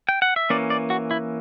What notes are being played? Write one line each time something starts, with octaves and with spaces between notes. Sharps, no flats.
G5
F#5
E5
E3 A#3 C#4 D5
D5
F#4
E4